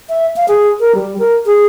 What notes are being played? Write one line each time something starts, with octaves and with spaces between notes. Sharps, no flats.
E5
F5
G#4
A#4
G3
A#4
G#4